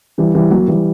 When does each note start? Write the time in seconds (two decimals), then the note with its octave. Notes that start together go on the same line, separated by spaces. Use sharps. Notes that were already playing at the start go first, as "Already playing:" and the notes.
0.18 E3 G3
0.35 E3 G3
0.51 F#3 A#3
0.68 E3 G3